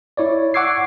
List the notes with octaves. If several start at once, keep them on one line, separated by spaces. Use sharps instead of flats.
E4 C#5 D5
F#5 C#6 D6 E6 G#6 C7